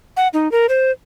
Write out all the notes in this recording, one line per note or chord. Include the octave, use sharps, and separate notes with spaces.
F#5
D#4
A#4
C5